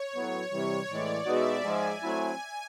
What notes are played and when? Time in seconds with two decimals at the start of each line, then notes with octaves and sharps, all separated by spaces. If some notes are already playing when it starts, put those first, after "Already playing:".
Already playing: C#5
0.13 A2 F#3 B3
0.51 C3 E3 G3 C#5
0.88 A2 E3 G#3 D5
1.26 B2 G#3 B3 D#4 F#4 E5
1.63 G#2 F3 G#3 G#5
2.01 F#3 A3 C4 E4